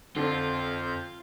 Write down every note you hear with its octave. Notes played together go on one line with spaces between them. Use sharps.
F2 D3 C4 F4 G6